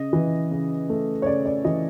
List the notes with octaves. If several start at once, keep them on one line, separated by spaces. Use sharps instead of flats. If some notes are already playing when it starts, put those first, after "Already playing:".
Already playing: C#3 D#5
E3
C#3
A3
C#5
C#3 D5
D5
E3 D#5